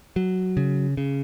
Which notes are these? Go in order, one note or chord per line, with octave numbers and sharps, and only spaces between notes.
F#3
C#3
C#3